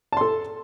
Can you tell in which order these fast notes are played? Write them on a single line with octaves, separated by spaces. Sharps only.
A5 C6 A4